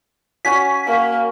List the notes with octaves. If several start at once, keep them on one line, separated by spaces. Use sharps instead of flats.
C#4 F#4 G#5 B6
A#3